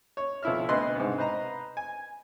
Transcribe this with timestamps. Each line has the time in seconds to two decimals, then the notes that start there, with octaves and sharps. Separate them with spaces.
0.17 C#5
0.43 B1 F3 E4 E5 F6
0.69 D2 B2 B4 D#5 C6 F#6
0.96 C2 G#2
1.18 B4 C5 D#5 A#5
1.77 G#5